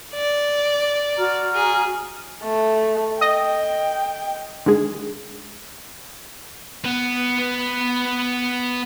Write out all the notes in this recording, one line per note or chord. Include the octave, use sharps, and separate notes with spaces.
D5
F#4 A#5 F6
G#4
A3
D#5 G5
D3 D#3 G#3 G#4
B3 B4